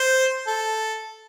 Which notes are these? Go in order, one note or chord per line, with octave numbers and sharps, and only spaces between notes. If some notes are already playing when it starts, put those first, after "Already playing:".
Already playing: C5
A4